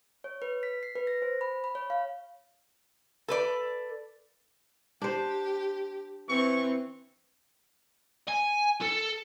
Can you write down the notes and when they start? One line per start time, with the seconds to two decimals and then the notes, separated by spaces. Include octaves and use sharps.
0.24 C#5
0.42 B4
0.63 B6
0.83 C7
0.96 B4
1.07 A#6
1.22 C5
1.41 B5
1.64 B5
1.75 C#5
1.90 F5
3.28 A4 B4 D5
5.02 D4 G4 C5
6.29 E3 C4 C#6
8.28 G#5
8.82 A4